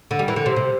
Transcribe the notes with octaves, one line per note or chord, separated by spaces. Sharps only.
D3
G3
E3
D3
C3
C3